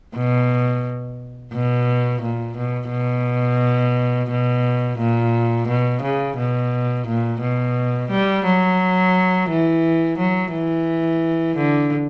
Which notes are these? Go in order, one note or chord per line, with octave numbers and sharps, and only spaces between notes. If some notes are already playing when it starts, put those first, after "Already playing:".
B2
B2
A#2
B2
B2
B2
A#2
B2
C#3
B2
A#2
B2
G3
F#3
E3
F#3
E3
D3